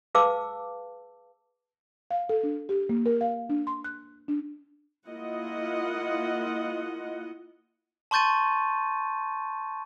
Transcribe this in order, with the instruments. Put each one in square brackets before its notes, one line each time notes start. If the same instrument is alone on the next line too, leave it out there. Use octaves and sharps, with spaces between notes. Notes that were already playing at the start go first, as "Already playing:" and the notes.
[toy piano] G#4 B4 F5 A5 D6 E6
[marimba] F5
A4
D4
G4
A#3
A#4
F5
D4
C6
F#6
D4
[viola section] A#3 E4 F4 D#5 F#5
[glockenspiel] A5 C6 C#6 G6 A6 D#7